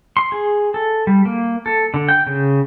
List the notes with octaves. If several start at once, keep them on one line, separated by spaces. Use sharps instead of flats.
C6
G#4
A4
G3
A#3
A4
D3
G5
C#3